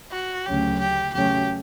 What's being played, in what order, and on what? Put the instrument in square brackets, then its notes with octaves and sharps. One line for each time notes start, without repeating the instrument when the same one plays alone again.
[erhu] F#4
[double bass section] D2 C#3 F#3 C#4 [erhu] G4
[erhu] G4
[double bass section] E2 C#3 F#3 A3 C#4 [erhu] G4